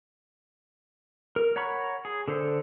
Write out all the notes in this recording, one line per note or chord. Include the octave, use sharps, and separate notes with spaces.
A#4
C#5 F#5 A#5 B5 C#6
G#4
D3 A4 C5